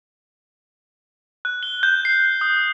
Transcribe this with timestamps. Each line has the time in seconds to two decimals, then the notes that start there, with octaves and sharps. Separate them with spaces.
1.45 F#6
1.63 G7
1.83 G6
2.05 C7
2.41 D#6